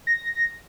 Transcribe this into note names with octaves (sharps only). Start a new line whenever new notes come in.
A#6